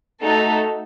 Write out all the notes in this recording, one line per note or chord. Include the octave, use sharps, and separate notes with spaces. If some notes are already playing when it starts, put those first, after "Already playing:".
A3 D#4 F#4 A4